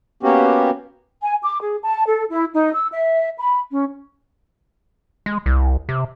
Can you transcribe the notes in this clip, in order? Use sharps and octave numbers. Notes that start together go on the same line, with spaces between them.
A#3 B3 C#4 F#4 G4
G#5
D6
G#4
A5
A4
E4
D#4
E6
E5
B5
C#4
G#3
C2
C3